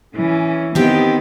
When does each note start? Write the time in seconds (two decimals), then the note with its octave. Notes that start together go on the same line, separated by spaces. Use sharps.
0.15 E3 C#4
0.75 D#3 B3 C4 G4